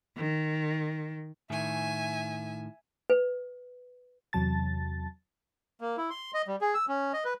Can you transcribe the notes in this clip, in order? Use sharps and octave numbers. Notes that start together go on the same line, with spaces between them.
D#3
A2 D#3 G#4 E5 G#5
B4
E2 C3 F#3 A5 A6
A#3
E4
C6
D#5
G3
G#4
E6
C#4
D#5
B4